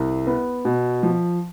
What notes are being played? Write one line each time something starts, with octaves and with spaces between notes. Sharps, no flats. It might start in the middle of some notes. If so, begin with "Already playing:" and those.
Already playing: C2
B3
B2
F3